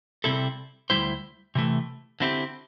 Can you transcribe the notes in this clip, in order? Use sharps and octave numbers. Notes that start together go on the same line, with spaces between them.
C3 G3 C4 E4 A4
D2 C3 G3 E4 C5
C3 E3 A3
D3 C4 E4 G4